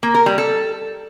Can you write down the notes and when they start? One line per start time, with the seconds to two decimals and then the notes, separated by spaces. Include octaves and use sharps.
0.03 A#3
0.15 A#4
0.26 G3
0.38 A4